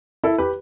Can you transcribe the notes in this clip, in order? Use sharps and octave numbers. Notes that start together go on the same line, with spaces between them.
E4 A4
G4 B4